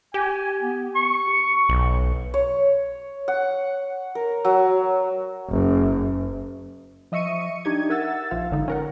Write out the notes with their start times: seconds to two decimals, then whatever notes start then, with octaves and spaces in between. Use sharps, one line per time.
0.14 G4 G#5
0.61 B3
0.96 C#6
1.69 B1
2.34 C#5
3.28 F#5
4.15 A#4
4.45 F#3
5.49 F#1
7.12 F3 D#5 E5 C#6 C#7 D#7
7.65 D4 D#4 G4 G#6
7.90 A#4 E5 F#5 E6 A6
8.31 A#1 F3 F5
8.51 G#1 D3 D#4
8.68 C#4 A#4 F#5